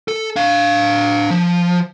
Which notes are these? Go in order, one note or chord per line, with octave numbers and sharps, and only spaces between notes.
A4
D4 F5
F3